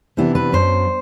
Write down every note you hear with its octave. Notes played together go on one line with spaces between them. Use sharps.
C3 E3 B3 D4 E4
B4
F#2 F#3 B3 D4 C5